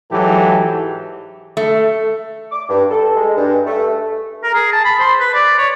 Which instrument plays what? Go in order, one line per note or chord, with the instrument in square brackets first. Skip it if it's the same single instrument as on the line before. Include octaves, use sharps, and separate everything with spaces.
[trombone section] G#2 E3 F#3 G4 A4
[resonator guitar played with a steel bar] A3
[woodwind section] D6
G2
A4
G#3
G2
A3
[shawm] A#4
G#4
A5
B5
C5
B4
D5
C#5